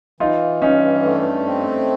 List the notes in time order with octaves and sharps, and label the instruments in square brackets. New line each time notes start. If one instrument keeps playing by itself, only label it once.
[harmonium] E3 [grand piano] D#4 F4
[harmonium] G2 [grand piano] C#4 D#4
[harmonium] A3
C4